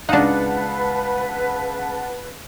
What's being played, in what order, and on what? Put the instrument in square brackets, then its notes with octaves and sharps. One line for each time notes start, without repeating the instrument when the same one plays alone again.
[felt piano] C#2 F5 [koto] D4 D#4 [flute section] B4 [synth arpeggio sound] F#5 A5